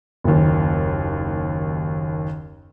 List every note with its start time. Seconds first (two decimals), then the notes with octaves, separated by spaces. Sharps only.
0.24 F#1 D#2